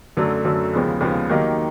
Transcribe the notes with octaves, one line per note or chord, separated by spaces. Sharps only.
F#2 D3 F#3 A3
F#2 D3 F#3 A3
D#2 C#3 F3 G#3 B3
D#2 C#3 F3 G#3 B3
D#3 F#3 A#3 D#4 G4